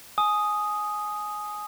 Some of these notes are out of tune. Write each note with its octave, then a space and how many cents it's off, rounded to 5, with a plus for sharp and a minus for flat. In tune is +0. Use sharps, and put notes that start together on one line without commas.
G#5 +15 D#6 +0